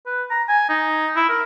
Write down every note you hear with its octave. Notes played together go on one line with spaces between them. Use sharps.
B4
A#5
G#5
D#4
E4
A#4